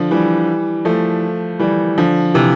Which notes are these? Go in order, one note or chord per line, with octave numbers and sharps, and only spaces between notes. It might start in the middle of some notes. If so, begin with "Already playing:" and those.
Already playing: D3 F3
E3 G3
F3 A3
E3 G3
D3 F3
C3 E3